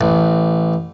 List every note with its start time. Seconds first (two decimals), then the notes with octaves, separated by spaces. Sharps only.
0.01 A1